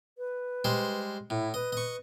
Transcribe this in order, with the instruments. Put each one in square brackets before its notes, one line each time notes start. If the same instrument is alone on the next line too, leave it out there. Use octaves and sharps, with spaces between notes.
[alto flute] B4
[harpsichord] G3 G#3 C5
[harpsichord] A2 [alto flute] E4
[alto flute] B4 [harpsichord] D#5
[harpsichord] D#5 C#6